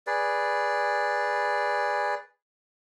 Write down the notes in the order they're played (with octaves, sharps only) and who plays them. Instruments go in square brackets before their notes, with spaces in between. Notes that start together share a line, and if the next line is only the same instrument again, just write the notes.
[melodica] G#4 B4 D5